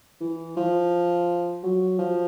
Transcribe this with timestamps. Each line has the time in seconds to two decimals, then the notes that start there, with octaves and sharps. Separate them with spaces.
0.21 E3
0.57 F3
1.63 F#3
1.99 F3